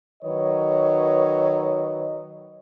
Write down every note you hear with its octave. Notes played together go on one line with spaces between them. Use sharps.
D#3 F#3 B4 C#5 D#5